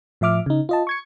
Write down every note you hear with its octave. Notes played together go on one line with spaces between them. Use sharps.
A2 F3 E5 D6 F6
C#3 D#4
F4 D#5 A5
C#6 G#6 C#7